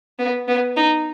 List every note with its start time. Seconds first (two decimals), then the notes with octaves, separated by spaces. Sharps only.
0.19 B3
0.48 B3
0.76 D#4